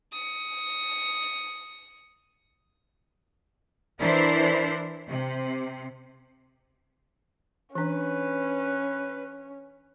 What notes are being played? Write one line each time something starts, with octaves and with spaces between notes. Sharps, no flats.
D#6 C#7
E3 D4 E4 A#4 C5
C3
E3 C#4 D4 B4